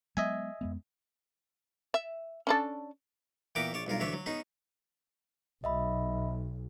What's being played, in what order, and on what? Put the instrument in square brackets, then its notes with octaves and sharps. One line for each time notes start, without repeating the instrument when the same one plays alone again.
[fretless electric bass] F#3 G#3 B3 [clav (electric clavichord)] D#5 E5 G#5
[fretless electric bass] F2 G#3 B3
[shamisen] E5
C#4 D4 A4
[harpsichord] A#2 E3 B3 A#4 G5 D6
A#1 C#5 D5
B1 G2 F4 A#4
D2 E3 D4 C#5 E5
F#3
B3 C#4 D#4 G#4
[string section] B1 [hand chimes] D#5 E5 B5